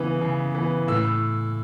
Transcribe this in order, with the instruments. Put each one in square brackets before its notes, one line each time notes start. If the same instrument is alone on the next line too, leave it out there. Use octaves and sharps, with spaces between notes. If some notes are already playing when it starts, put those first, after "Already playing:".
Already playing: [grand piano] C#3 E3 B3
C#3
E3 B3
A2 E6